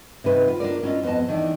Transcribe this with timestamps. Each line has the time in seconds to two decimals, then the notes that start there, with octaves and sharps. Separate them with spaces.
0.24 C3 D#3 B4 C5
0.48 F4
0.60 D4 F4 A#4 D5
0.83 C#4 E4 F4 D#5
1.03 F2 B3 E4 D#5 A5
1.28 D#3 E3 D4 D5